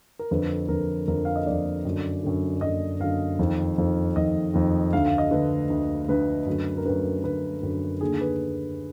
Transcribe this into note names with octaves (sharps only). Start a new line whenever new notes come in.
A#4
F2 D3 B4
F2 D3 A#4
F2 D3 A#4
F5
D#5
F2 D3 D5
F#2 D3
F#2 D3
F#2 D3 D#5
F#2 D3 F5
F2 D#3
F2 D#3
F2 D#3 D#5
F2 D#3
D2 D3 F5
F5
D#5
D2 D3 B4
D2 D3
D2 D3 B4
F#2 D3
A#4
F#2 D3 B4
F#2 D3 B4
F#2 D3
D#2 D3 G#4
B4